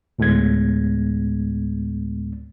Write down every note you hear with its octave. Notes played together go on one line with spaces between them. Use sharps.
D2 A2 G#3 B3 G#6